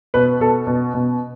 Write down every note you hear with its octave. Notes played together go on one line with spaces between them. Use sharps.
B2 B4
B2 A4
B2
B2